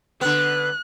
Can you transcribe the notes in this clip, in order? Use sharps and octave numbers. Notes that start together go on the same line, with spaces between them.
D3 B3 F#6